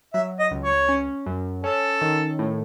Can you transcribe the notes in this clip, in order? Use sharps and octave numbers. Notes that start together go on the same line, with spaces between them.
F#3 E5
D#5
C#2
C#5
C#4
F#2
C#4 A4
D#3
A2